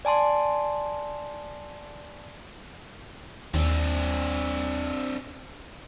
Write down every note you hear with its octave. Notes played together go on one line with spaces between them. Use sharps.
D5 G#5 A5 C6
D#2 C4 D4